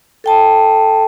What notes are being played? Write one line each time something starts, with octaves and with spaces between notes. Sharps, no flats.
A4 G5 A5